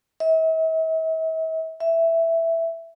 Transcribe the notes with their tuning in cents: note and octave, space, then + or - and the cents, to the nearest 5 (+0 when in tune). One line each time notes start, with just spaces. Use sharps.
E5 -45
E5 +5